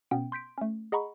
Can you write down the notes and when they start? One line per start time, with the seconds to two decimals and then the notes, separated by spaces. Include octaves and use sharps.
0.11 B2 B3 C#4 G5
0.32 C6 G6 B6 D7
0.58 A3 C#4
0.92 G#4 D#5 F#5 A#5 B5 C#6